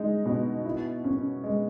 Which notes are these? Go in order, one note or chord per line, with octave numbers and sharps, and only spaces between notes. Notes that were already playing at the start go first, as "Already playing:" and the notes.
Already playing: G#3 D#4
B2
E4
C#4
G#3